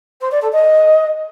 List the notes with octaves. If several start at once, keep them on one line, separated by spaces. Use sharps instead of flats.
C5
D5
A4
D#5